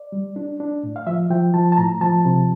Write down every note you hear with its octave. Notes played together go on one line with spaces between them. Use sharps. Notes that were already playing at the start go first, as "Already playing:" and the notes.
Already playing: D5
G3
D4
D4
A2
F5
F3 E5
F3 G5
F3 A5
A5
A2 A#5
F3 A5
C3